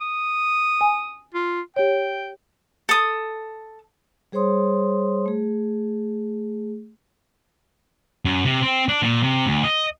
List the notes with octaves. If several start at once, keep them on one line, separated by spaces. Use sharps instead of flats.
D#6
G#5
F4
G4 C#5 G5
A4 D#6
G3 G#4 C5 C#5 C6 D#6
A3 G#4
F#2
C3
C4
D4
A#2
C3
D2
D#5